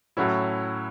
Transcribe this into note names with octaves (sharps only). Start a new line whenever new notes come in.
A2 F#3 C#4 E4